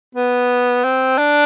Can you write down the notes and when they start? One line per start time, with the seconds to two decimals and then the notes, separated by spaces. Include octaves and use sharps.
0.15 B3
0.84 C4
1.18 D4